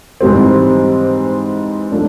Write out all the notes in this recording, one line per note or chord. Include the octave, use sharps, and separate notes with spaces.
G#2 E3 G3 C4
F3 A3 D4